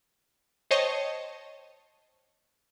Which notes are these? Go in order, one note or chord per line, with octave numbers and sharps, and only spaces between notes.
C5 C#5 D#5 G5 A5 C#6